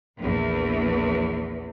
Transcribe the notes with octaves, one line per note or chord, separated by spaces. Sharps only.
A#1 E2